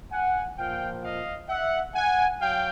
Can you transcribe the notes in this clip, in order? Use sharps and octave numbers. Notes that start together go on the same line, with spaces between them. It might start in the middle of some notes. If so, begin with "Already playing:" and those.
F#5 G#5
A#2 F3 F5 G5
D#5 F5
E5 F#5
F#5 G#5
F#3 F5 G5